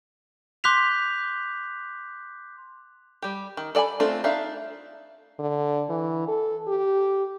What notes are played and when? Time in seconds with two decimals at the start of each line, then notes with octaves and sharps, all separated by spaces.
0.64 C6 D6 F#6 G6 B6 F7
3.22 G3 G4
3.57 D#3
3.75 A4 D5 G5 G#5 B5
4.00 A3 C4 D4 F4 A4
4.24 D4 D#4 E5 F5
5.39 D3
5.89 E3
6.28 A4
6.67 G4